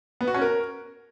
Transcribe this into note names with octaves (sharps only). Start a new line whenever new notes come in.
B3
F#4
C#4
A#4